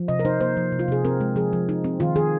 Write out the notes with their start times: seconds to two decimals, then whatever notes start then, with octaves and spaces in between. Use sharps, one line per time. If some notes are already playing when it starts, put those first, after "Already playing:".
Already playing: F3
0.08 C3 D#5
0.19 A#4
0.25 D#4 C5
0.41 A#3 C5
0.57 F3
0.72 C3
0.79 F4
0.88 C3 G#4
1.05 C4 A#4
1.20 G#3
1.36 F3 G#4
1.53 F3
1.69 D#4
1.84 C4
2.00 D#3 F4
2.16 D#3 G#4